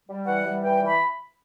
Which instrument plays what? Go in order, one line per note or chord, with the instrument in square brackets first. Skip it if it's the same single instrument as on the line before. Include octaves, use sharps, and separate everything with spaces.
[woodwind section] G3
E3 F#5
G3
E3 G5
E3
B5